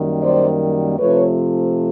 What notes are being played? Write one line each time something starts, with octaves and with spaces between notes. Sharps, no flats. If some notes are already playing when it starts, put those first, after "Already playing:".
Already playing: F#2 D#3 G3 A#3
C5 D5
C3 F3 A3 B4 C#5